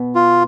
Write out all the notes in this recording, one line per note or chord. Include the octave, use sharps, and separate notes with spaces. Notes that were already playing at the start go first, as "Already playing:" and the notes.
Already playing: B2 B3
F4